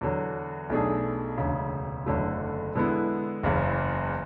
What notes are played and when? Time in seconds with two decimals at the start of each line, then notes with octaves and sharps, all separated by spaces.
0.01 E2 D3 F#3
0.70 B1 B2 A3 D4 G#4
1.38 E1 D2 C#3
2.06 F#1 E2 D3 F#3 A3
2.75 D3 G#3 B3 E4
3.43 F#1 E2 C#3